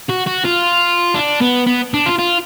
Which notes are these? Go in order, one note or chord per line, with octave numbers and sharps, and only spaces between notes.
F#4
F#4
F4
D4
B3
B3
D4
F4
F4